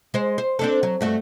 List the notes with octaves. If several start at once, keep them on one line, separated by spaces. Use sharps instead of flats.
G#3 C5
C5
C4 D4 A4
F#3
G2 A3 F#4